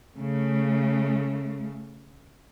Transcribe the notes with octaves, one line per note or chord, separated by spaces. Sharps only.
C#3 A3